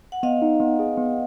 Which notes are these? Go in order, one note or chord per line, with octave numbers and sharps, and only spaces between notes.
F#5
B3 D#5 F5
D#4
B3
G#4
B3